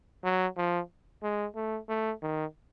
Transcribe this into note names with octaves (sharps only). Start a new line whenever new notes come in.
F#3
F3
G#3
A3
A3
D#3